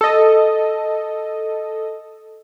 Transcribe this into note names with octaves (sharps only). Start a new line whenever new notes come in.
A4 D#5